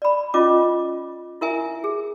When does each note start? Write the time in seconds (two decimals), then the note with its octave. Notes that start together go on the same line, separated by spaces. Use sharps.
0.02 D5 B5
0.34 C#4 F4 D#5 D6
1.41 E4 A#4 E5 G#5
1.84 G#4